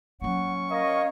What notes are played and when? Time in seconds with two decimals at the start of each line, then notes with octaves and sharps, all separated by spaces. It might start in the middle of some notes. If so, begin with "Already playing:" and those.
0.22 F#3 A#3 C#4 F#5 C#6
0.71 A#4 C#5 D#5 F5